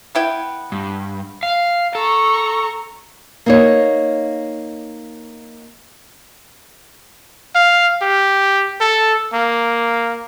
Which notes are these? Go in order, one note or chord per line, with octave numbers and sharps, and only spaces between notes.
B3 E4 G5
G2
F5
A4 A#5 C#6
A#3 D#4 C#5
F5
G4
A4
A#3